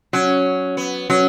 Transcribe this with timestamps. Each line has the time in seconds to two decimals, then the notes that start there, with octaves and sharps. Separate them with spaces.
0.13 F#3 C#4
0.77 B3
1.10 F#3 C#4